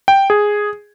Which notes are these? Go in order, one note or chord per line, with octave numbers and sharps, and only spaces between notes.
G5
G#4